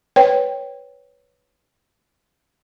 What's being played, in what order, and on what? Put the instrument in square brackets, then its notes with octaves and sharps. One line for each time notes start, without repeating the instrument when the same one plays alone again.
[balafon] B4 C#5 G5